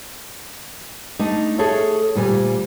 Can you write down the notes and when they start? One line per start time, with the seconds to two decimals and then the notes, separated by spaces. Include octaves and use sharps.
1.19 A3 D4 D#4
1.58 G#4 A4 C#5 E5
2.15 D2 A#2 G3 G#5